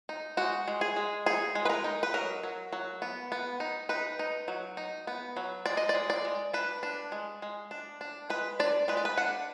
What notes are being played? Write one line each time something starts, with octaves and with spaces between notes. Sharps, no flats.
D#4
G#3 F#4
G#3
G#4
G#3
D#4 G#4
G#3
B4
A#4
D#4
B4
F#3 A#4
F#3
F#3
B3
B3
D#4
D#4 B4
D#4
F#3
D#4
B3
F#3
G#3 D5
D#5
D5
G#3
D5
G#3
D4 B4
D4
G#3
G#3
D4
D4
G#3 B4
D4 D5
G#3 B4
D5
B4
D4 F#5